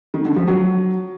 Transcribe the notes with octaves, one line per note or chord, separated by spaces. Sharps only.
D#3
D3
F3
F#3